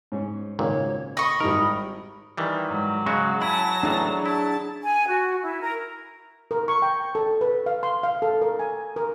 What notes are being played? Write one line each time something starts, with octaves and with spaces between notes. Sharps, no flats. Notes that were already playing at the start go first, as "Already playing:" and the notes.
G#2 C#4
G#1 C#2 A#2 C#5
D#5 B5 C#6
G#1 G3 D#4 A#4
D#3 E3 G3
G#2 F#3
C#3 G#3 F#4 C#6
E4 G#5 A5 B5 A#6
A2 E3 D4 G#4 A#5
E4 A5
G#5
F#4
E4
A#4
A#4
C#6
G5
A4
B4
F5
C6
F5
A4
A#4
G#5
A#4